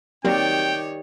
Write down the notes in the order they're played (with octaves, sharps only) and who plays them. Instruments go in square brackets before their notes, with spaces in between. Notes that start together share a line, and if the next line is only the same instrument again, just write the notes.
[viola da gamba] D#3 C#5 [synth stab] F#3 A#3 C4 [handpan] G4 D5 [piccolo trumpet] G5